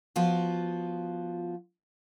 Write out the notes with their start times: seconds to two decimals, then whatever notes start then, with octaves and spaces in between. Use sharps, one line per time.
0.16 F3 B3 F4 F#4